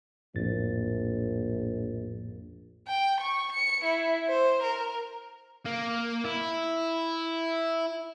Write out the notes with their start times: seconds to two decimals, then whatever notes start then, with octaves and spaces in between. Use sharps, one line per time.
0.35 A#1 F2 A2 A6
2.87 G5
3.21 C#6
3.53 C#7
3.85 E4
4.28 C5
4.63 A#4
5.66 A#3
6.25 E4